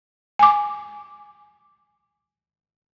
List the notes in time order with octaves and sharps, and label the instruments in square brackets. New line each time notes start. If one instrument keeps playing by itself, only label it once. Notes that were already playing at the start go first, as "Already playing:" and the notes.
[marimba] G#5 D6